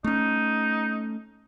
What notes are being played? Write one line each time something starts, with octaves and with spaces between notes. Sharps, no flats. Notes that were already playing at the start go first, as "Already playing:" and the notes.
A3 C#4 D#4